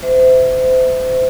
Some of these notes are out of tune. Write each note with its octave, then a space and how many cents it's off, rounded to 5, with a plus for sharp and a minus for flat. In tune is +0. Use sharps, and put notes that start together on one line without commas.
C5 -35 E5 -15